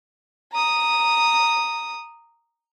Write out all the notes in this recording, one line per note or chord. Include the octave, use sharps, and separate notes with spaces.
A#5 D#6